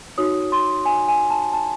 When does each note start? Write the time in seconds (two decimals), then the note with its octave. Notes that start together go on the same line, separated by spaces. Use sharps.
0.18 D#4 F#4 C#5 D#6
0.52 C6
0.86 G#5
1.08 G#5
1.30 A5
1.53 A5